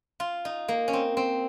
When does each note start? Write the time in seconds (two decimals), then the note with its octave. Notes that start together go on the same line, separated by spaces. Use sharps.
0.20 F4
0.45 D#4
0.68 A#3
0.88 C#4
0.93 C4
1.17 C4